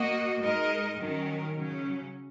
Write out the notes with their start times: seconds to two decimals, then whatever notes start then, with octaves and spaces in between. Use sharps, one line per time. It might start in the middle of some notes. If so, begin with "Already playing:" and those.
Already playing: A#3 F#4 D#5
0.42 G#3 D#4 A#4 D#5
0.98 D#3 F#3 C#4 A#4
1.55 C#3 F#3 C#4